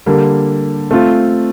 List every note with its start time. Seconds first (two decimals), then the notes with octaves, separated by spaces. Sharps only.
0.06 D3 G3 A#3
0.91 A3 C4 F4